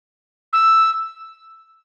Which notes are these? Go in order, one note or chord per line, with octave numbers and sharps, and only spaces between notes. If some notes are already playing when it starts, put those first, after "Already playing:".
E6